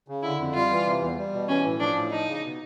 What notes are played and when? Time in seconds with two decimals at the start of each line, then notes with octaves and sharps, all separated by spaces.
0.08 C#3
0.23 D3 E4
0.39 F2
0.54 G3 F4
0.71 E3
0.86 C3
1.02 E2
1.18 G3
1.33 B2
1.48 E3 C#4
1.64 A2
1.80 F3 D4
1.96 A2
2.11 F3 D#4
2.27 C#3
2.43 B2